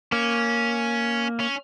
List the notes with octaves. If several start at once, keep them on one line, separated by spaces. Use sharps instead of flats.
A#3 C#4
C#4